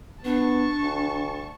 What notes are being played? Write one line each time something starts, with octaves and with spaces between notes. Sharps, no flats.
B3 D4 A5 C#6
D2